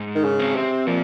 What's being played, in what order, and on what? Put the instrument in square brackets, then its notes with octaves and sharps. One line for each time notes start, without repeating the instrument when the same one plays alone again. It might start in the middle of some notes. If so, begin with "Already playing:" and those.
Already playing: [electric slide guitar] G#2
[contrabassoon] D#3
C#3
[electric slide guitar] C4
[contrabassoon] C3
[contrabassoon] A#2 [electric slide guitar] F3